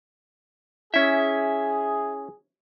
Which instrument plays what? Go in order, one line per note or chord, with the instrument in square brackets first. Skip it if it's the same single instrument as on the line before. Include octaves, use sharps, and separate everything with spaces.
[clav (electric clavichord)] C#4 E4 [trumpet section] G#4 [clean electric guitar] E5